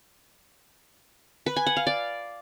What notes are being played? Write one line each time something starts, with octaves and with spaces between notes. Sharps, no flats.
B4
G#5
F#5
F5
D5